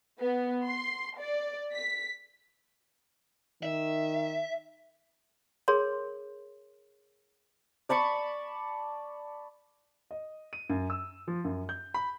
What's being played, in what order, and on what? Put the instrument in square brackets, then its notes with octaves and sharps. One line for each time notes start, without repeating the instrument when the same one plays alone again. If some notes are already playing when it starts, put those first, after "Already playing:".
[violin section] B3
C6
D5
B6
[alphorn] D#3 [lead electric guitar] E5
[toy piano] G#4 A#4 C#5 C6
[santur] D5 A5 B5 C#6
[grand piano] D#5
D#7
F#2
E6
F3
F#2
G6
B5